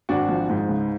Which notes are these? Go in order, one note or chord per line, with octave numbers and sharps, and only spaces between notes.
G#1 D4 F#4
F3
G#2
C#2